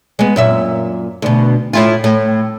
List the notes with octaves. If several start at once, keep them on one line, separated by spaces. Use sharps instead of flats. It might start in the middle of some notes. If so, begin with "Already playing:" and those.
G#3 B3
F#2 A#2 E5
D2 B2
A2 E4 F4
A2